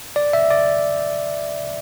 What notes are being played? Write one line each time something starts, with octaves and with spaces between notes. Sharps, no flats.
D5
E5
D5